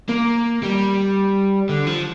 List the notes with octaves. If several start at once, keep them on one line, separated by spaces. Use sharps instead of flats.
A#3
G3
D3
F3